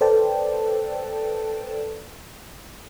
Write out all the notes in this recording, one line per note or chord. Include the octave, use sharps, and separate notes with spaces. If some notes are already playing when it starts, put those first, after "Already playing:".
A4 B4 C5 D5 G5 A5